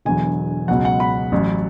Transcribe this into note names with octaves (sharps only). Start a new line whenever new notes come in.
E1 E2 D3 F#3 G#5
C#2 B2 F#3 F#5
F#5
B5
A1 A2 F#3